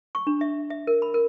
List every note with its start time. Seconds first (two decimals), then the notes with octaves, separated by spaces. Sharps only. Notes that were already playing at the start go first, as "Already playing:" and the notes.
0.15 C#6
0.27 D4
0.41 E5
0.70 E5
0.87 A#4
1.02 B5
1.14 A#4